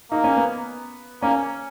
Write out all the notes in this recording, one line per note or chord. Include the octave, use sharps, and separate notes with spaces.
A#3 D#4
C#4
B3
A#3 C#4